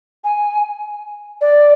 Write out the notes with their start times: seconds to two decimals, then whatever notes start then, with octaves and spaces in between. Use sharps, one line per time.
0.24 G#5
1.41 D5